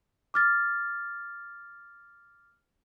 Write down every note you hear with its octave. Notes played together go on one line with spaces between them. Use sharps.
D6 F6 A6